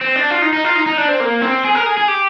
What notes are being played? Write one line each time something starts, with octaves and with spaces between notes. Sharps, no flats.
C4
D4
F4
D#4
D#4
F4
D#4
D#4
D4
C4
A#3
C4
G#4
A#4
G#4
G#4
G4